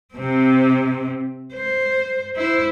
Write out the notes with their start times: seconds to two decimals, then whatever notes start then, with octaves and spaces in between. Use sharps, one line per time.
0.15 C3 C4
1.54 C5
2.36 E4 C5